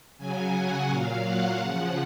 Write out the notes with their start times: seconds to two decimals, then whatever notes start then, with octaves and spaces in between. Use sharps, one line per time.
0.18 C#3 F#3 G#5
0.53 F#5
0.88 A#2 F#3 F5
1.23 F#5
1.57 C#3 F3 F#5